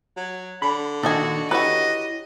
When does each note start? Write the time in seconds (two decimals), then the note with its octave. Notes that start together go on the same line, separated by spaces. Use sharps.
0.16 F#3
0.62 D3 B5
1.03 A#2 D#3 D4 F#4 A4 D#5 G#5
1.51 E4 F#4 G4 B4 C#5 D#5